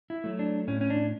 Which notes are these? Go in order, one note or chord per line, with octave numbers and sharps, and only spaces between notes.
E4
F#3 A3
D4
A2 C#4
C#4
D4